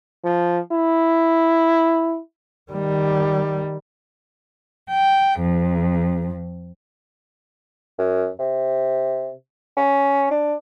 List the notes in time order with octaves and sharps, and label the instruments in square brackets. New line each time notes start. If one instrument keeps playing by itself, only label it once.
[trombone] F3
E4
[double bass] D#3 G3
[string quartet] G5
F2
[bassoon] F#2
C3
C#4
D4